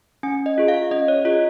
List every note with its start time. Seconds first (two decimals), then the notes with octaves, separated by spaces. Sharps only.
0.23 C#4 G#5
0.46 D#5
0.58 F4 G#4
0.68 F5
0.91 C#4 D#5
1.08 C#5
1.25 F4 G#4 D#5